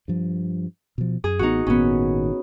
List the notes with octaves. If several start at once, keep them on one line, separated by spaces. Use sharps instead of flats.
G2 F3
B2 F3
F#2 G#4
A1 A3 B3 D#4 F#4
G#1 A#2 D#3 B3 C#4